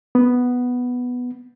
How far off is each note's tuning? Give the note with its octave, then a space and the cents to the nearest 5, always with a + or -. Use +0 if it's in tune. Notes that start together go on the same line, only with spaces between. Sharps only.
B3 +0